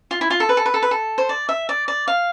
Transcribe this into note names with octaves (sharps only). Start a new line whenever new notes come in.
F4
E4
F4
A4
B4
A4
B4
A4
B4
A4
C5
D5
E5
D5
D5
F5